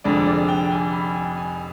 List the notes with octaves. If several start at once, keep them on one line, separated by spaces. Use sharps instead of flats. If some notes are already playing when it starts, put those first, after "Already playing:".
F1 F2 D3 G#3 D5
D5
G5
G#5
B5
G#5
G#5